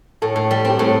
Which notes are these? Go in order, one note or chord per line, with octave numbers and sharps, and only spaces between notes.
A2 A4
A2
G3
C4 G4
A2 A4